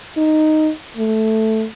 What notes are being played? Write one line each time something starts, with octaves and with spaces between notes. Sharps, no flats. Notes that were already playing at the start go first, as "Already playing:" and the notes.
D#4
A3